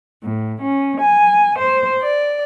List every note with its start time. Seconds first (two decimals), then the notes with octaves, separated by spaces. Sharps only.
0.22 A2
0.61 C#4
1.00 G#5
1.58 C5
2.03 D5